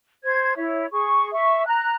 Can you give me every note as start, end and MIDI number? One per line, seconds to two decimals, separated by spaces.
0.24 0.56 72
0.24 0.56 92
0.57 0.85 64
0.57 0.85 73
0.57 0.85 76
0.92 1.31 68
0.92 1.31 85
1.33 1.65 76
1.33 1.65 85
1.67 1.96 82
1.67 1.96 90